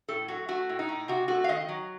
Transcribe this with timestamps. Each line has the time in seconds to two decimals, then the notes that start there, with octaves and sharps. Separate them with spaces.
0.08 A2 A4
0.28 F#3 F#4
0.48 A3 F#4
0.69 A2
0.79 D#4
0.89 A2
1.08 C3 F#4
1.28 A3 F#4
1.44 F5
1.48 D#3 D#5
1.69 F#3